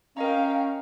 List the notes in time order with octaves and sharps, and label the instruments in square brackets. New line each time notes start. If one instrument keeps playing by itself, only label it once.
[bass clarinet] C#4 [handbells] A#4 D#5 A#5 [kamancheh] F5 G5